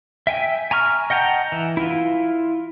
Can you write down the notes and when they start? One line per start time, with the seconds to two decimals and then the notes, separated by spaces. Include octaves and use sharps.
0.27 E5 G5 G#5
0.71 G#5 A#5 C#6 F6
1.10 D#5 F#5 G5 A5 A#5
1.52 E3
1.77 E4 F4